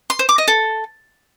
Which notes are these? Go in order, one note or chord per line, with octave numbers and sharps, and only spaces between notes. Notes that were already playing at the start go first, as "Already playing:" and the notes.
C6
C5
D6
D#5
A4